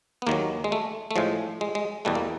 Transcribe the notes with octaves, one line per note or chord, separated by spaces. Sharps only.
B3
D#2 D#3 F#3 A#3
G#3
A3
A3
A2 F3 G#3
G#3
G#3
E2 B2 G3 A3
A#3